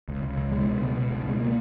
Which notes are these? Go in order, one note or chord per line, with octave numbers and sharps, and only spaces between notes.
C#2
C#2
C#2
B2 G#3
C#2
B2
B2
C#2
B2 G#3
A#3